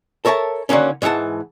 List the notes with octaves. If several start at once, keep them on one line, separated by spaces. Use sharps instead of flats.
A4 A#4 C#5 E5 A5
D3 D#3 F#3 A#3 C#4
G#2 E3 G4 F#5 A5